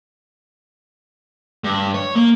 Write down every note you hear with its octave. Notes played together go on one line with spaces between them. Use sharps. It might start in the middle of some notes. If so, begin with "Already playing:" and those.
G2
C#5
A#3